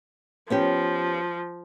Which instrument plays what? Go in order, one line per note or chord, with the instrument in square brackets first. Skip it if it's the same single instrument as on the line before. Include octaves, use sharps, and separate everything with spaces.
[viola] F3 [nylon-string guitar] B3 C#4 G4